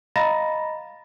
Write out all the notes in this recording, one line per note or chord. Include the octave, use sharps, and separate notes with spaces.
D#5 F5 A#5 B5 A6 A#6